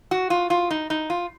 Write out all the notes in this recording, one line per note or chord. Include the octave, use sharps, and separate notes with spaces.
F#4
F4
F4
D#4
D#4
F4